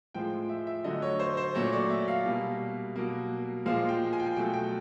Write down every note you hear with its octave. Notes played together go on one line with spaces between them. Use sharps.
A2 F3 G#3 G5
E5
E5
D3 F#3 A3 D#5
C#5
C5
C5
A#2 F#3 A3 C#5
D5
E5
F5
B2 G3 A#3
B2 F#3 A#3
A#2 F3 G#3 F5
G5
G#5
G5
G#5
B2 F#3 A3 G5
G5